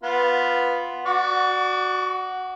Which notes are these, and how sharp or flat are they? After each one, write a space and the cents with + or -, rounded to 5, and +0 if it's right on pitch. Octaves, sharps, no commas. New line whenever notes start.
B3 +0 F4 +0
F#4 +0 D5 +15 C#6 +40